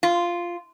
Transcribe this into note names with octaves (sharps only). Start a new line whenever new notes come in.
F4